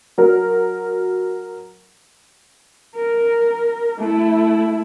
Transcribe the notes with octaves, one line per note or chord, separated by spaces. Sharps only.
F#3 A#4
A#4
A3 E4